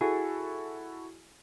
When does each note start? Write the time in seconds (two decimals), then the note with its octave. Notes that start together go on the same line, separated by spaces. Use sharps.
0.01 E4 F#4 G#4 A4